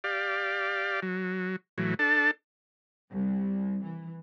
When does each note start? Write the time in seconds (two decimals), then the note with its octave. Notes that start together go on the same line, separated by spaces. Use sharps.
0.04 G4 D5 F5
1.02 F#3
1.78 A2 E3 F#3
1.99 D4 A4 A5
3.11 C2
3.83 E3